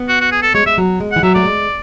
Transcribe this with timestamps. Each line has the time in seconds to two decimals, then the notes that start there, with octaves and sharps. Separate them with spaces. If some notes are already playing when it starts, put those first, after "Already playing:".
Already playing: B3
0.09 F#4
0.21 F#4
0.32 G#4
0.43 A4
0.55 G#3 C#5
0.66 G#3 E5
0.78 F#3
1.00 G#3
1.12 E3 F#5
1.23 F#3 E5
1.35 A3 D5
1.46 G#3